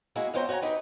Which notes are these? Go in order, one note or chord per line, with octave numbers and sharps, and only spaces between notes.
G#3 A#3 E4 F#4 G#4
F2 B3 C#4 C5 G5 A#5
F#4 C#5 F#5 G#5 A#5
D#4 G4 B4